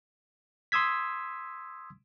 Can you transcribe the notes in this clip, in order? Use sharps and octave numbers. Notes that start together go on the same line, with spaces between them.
C6 D#6 E6 G#6 B6